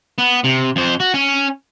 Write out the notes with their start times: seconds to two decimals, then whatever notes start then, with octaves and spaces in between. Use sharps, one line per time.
0.18 B3
0.44 C3
0.76 F2 C5
1.00 F#4
1.14 C#4